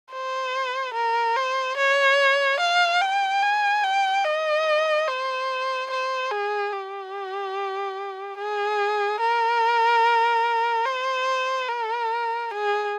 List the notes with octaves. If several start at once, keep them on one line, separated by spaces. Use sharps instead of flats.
C5
A#4
C5
C#5
F5
G5
G#5
G5
D#5
C5
C5
G#4
G4
G#4
A#4
C5
A#4
G#4